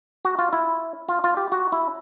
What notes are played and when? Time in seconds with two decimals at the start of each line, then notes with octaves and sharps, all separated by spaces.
0.25 F#4
0.39 F4
0.53 E4
1.09 F4
1.24 F4
1.37 G4
1.52 F#4
1.72 E4